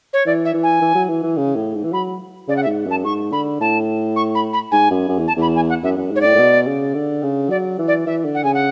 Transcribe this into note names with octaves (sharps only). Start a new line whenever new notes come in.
C#5
E3 D5
E5
E3
G#5
E3
F#3
E3
E3
C#3
A2
G#2
E3
F#3 B5
C#3 D5
F#5
E5
G#2
F#2 A5
G#2 C#6
D3 B5
A2 A5
C#6
B5
B5
G#2 G#5
F#2
F#2
E2
A5
E2
B5
G#5
F#5
F#2 E5
F#2
G#2 C#5
A2 D5
A2
B2
C#3
D3
C#3
F#3 D5
E3
D5
E3 E5
D3
F#5
C#3 G#5
F#5